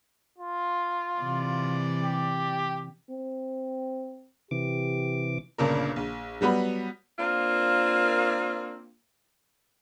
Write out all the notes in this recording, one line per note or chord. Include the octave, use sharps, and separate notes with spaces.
F4
C3 E3 D5
G4
C4
C3 E3 G4 D6
G1 A#2 C#3 D4 A#4
A#1
F#3 G3 B3 B5
A#3 C4 D4 F4 A#4